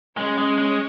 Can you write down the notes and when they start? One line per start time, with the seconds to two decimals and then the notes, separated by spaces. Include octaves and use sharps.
0.17 G#3 C#4 C#5
0.38 G#3
0.58 G#3